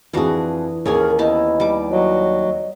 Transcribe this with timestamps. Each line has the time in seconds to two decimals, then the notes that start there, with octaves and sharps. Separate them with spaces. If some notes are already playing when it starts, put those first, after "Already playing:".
0.13 F2 E3 D4 F#4 G#4
0.86 D#2 C#4 G#4 A#4 C#5 G#5
1.19 B3 E4 D#5 A5
1.60 G3 D6
1.90 F#3 D#5